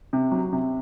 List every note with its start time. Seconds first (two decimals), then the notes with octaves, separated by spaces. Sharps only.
0.13 C3
0.32 F#3
0.53 C3